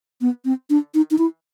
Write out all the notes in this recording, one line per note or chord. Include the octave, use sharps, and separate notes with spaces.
B3
C4
D4
D#4
D#4
E4